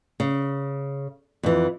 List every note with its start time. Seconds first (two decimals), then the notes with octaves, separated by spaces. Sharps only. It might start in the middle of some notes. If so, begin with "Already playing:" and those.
0.20 C#3
1.43 F2 E3